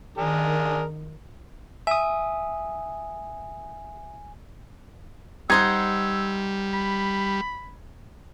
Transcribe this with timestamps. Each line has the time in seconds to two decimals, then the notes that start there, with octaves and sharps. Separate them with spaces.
0.18 D#3 D4 G#4 A#4
1.87 E5 G#5 D#6
5.50 G3 D#4 C5 F#5 E6 G#6
6.73 B5